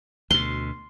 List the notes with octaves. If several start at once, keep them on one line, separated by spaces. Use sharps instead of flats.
D2 B2 C6